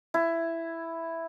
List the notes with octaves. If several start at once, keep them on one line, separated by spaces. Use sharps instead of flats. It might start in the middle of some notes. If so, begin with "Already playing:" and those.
E4